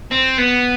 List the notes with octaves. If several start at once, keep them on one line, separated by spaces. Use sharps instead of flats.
C4
B3